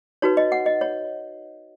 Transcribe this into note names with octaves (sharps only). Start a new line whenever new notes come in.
D#4 F#4 B4 C#5
D#5
F#5
D#5
C#5